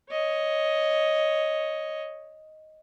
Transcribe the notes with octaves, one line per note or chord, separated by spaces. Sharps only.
C#5 D#5